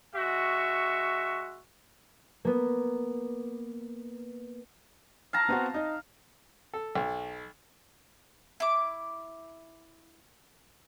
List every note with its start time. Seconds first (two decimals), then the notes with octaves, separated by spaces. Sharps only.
0.15 G#3 F#4 E5 C#6
2.45 A#3 B3
5.33 F5 A5 A#5
5.49 B3 C4 F#4
5.74 D#4 D#5
6.74 A4
6.96 B1
8.60 E4 D6